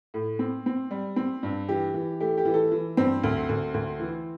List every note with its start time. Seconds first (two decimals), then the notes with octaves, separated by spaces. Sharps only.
0.14 A2
0.39 C4
0.66 C4
0.91 G3
1.16 C4
1.43 G2
1.68 E3 G4
1.94 E3
2.20 A3 G4
2.37 G4
2.45 E3
2.54 A4
2.71 E3
2.97 G2 C4 C5
3.24 D2
3.49 D2
3.74 D2
4.00 E3